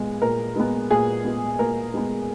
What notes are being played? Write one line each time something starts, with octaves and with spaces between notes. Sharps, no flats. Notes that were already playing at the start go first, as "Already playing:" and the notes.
Already playing: A#2 G#3 B3
A#2 A#4
G#3 B3
A#2 G#4
G#3 B3
A#2 A#4
G#3 B3